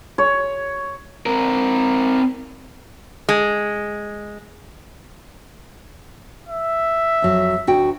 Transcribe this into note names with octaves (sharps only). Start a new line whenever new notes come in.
C#5
C4 A#4
G#3
E5
F2 F#3
D2 F#4 G5